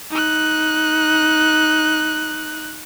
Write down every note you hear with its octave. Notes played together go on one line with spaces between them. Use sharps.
D#4 F#6